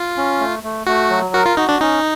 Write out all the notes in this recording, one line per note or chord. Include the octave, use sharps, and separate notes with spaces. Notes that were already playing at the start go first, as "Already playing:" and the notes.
Already playing: F4
C#4
A3
A3
A3 F#4
F#3
F#4 A#4
F4
D#4 F#4
D4
C#4 D#4